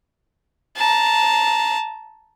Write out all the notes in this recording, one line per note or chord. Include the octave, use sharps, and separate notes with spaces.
A5 A#5